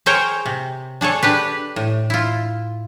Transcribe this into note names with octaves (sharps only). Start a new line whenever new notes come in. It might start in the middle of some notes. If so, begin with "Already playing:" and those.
G#4 A#4 C5 C#5 G5 A#5
C3
D4 G#4 A4 C#5
D4 G4 B4
A2
E4 F4